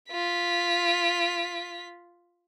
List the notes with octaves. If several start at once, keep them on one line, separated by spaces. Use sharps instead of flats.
F4 B6